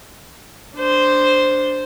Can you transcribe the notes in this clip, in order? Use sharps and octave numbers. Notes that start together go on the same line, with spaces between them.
D4 C5